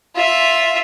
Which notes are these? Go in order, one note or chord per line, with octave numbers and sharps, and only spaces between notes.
F4 E5